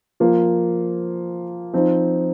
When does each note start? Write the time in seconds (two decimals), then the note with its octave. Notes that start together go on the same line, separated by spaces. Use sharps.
0.20 F3 A#3 F4
1.74 F3 C4 D#4